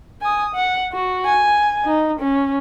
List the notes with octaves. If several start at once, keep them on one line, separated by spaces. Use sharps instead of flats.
G#5 D#6
F#5
F#4
G#5
D#4
C#4